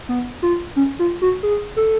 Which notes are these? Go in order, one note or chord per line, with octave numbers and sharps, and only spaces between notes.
B3
F4
C#4
F4
F#4
G#4
A4